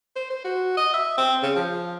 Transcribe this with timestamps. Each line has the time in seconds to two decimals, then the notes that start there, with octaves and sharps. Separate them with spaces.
0.16 C5
0.30 C5
0.44 F#4
0.77 D#5
0.94 E5
1.18 C4
1.43 C#3
1.55 F3